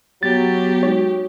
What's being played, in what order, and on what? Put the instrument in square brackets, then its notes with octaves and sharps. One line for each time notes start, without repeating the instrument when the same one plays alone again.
[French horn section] F#3 [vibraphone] B3 [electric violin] G4 [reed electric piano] A6
[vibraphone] G#3 D#4 F#4 [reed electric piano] C#5